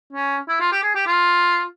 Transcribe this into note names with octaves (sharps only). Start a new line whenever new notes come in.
C#4
E4
F4
G4
G#4
G4
F4